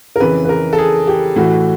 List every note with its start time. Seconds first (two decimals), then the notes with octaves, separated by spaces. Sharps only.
0.16 A#4
0.20 F2 C#3 E3 B4
0.45 B4
0.49 A#4
0.73 A4
0.78 G#4
1.07 G4
1.36 A2 E3 F#4